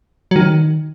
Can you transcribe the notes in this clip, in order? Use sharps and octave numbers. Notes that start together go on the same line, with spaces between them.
F#3
D#3